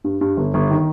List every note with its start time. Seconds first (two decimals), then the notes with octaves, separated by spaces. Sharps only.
0.04 G2
0.21 G2
0.37 G1
0.54 G1
0.71 D#3